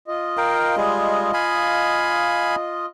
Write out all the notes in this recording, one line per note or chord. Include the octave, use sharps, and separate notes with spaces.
F4 D#5
A#4 F5 G5
G3 G#3 G#4
F5 G#5 B5